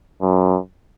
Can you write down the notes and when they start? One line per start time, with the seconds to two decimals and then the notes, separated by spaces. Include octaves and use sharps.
0.22 F#2